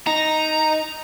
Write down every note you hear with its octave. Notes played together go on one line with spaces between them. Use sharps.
D#4 A#5